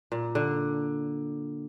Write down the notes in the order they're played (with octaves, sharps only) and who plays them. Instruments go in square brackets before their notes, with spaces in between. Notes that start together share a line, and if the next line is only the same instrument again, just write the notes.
[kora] A#2
D3